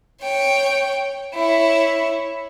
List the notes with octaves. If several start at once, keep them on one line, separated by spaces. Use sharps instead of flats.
C#5 G5
E4 C#5